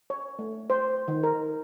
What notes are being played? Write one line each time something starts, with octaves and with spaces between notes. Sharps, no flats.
C#5
A3
C5
D#3
A#4